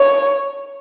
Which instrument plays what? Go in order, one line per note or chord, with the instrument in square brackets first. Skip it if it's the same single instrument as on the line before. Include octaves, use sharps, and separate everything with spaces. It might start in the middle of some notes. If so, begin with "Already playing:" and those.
Already playing: [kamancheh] C#5